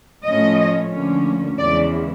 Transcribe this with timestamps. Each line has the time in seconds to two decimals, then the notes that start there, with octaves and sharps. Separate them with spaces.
0.25 A2 F3 A3 C#4 D#5
0.91 D2 D3 F3 A#3 C#4
1.57 E2 C#3 E3 G#3 D5